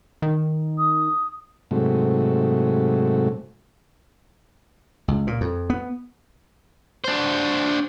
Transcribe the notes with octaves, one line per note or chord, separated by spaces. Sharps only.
D#3
D#6
G#2 C3 F#3 A3
C#2
A#2
F2
B3
D4 C5